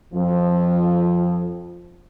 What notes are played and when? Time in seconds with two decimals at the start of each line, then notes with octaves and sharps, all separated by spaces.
0.14 F2 F3